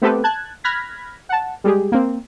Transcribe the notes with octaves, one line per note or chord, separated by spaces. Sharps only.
A3 B3 C4 G4 A4 B4
A5 F#6 G#6
B5 F6 F#6 G#6 A#6 B6
F#5 A5
G3 G#3 G4 G#4
A#3 C4